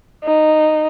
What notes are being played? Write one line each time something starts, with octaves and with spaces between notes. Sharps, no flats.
D#4